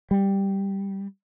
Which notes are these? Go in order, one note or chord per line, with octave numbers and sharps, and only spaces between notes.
G3